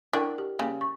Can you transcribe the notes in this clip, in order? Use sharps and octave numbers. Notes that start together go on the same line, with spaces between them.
D4 E4 F#4 A#4 G5
G4
C#3 G3 A#3
C#6